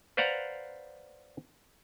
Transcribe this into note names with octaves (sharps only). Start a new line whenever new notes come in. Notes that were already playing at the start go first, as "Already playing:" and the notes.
B4 C5 D5 F5 F#5 A#5